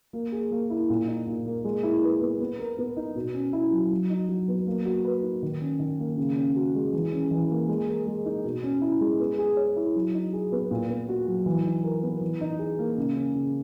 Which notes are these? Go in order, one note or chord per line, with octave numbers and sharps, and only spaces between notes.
A#3
G#4
A#3
E4
A#2
D#4
A#2
A#3
G#3
E4
B4
B3
B3
A#4
B3
D#4
B2
C#4
E4
F#3
F#3
D#4
F#3
B3
A#3
F#4
B4
D#4
D#3
C#4
D#3
A#3
C#3
C#4
F#4
G#3
E3
C#4
E3
A#3
G#3
A#4
G#3
D#4
B2
C#4
E4
G#3
B3
G#4
C#5
E4
F#3
D#4
G#4
B3
A#2
B3
F#4
F#3
E3
D#4
A#4
B3
E3
D#4
G#4
A#3
C#3
C#4
C#3